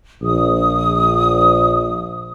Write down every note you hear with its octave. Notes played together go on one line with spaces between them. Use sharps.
A#1 D#6